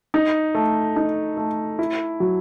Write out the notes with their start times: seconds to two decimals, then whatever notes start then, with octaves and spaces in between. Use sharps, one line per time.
0.14 D#4
0.55 A3
0.96 D#4
1.37 A3
1.79 E4
2.20 F#3